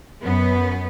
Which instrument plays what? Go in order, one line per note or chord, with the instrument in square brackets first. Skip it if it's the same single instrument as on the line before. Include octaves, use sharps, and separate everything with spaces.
[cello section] F#2 B3